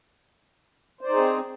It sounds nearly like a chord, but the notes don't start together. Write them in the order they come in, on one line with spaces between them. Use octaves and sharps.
C5 D5 D#4 G#4 C4